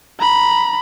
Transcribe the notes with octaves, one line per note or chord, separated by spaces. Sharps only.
A#5 B5